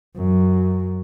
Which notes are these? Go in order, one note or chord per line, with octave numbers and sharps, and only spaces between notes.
F#2